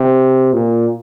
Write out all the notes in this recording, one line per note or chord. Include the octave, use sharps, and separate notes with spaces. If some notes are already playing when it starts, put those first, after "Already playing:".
Already playing: C3
A#2